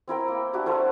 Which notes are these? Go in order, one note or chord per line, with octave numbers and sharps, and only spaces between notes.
C4 E4 A#4 G5
A#3
D4 F#4 G4 E5
A3 E4 C5 F#5